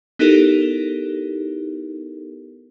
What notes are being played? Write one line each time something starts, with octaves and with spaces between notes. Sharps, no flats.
B3 D#4 E4 G4 A4 A#4